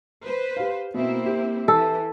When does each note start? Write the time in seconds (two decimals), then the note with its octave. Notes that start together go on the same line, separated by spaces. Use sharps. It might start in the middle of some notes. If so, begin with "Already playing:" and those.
0.23 B4 C5
0.57 G4 F5
0.94 B2 A#3 C4 E4
1.26 G4
1.68 E3 A4